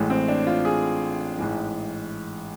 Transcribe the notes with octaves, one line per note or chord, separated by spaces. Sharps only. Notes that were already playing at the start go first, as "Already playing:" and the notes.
Already playing: A1 A2 G#3
C4
D4
F4
G#4
A1 G#2 E3 G#3